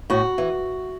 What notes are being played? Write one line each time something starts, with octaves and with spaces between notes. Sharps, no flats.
A2 F#4
E3